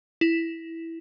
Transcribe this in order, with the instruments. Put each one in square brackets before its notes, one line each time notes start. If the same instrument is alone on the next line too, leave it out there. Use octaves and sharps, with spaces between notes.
[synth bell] E4